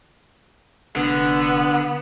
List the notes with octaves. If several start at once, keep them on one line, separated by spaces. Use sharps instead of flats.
F1 D3 B3